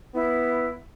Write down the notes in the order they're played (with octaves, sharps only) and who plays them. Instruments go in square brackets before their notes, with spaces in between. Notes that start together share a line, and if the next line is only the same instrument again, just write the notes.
[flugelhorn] B3 [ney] E4